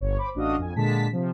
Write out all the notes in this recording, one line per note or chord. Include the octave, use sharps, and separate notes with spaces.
G1 C#5
C5 B5 D6
A1 D4 F#4 D#5 F5 D#6
F2 G#5
A#2 D3 G#3 A5 B6
C3 F3